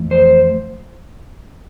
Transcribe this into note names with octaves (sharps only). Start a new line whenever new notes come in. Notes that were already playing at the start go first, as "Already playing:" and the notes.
Already playing: F2 E3 A3
C5